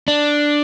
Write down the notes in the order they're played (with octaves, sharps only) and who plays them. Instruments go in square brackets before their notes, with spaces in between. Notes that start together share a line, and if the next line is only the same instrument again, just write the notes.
[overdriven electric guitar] D4